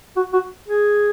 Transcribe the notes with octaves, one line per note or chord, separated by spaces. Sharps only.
F#4
F#4
G#4